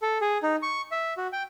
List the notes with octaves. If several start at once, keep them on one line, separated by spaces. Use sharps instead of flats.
A4
G#4
D#4
C#6
E5
F#4
G5